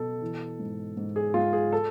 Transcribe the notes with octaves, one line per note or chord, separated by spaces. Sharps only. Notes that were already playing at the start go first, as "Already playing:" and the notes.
Already playing: B2 A4
E3
G#2
G#2
G#4
G#2 F4
G#4
A4